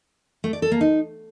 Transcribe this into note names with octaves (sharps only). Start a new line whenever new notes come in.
A3
D5
A4
A#3
D#4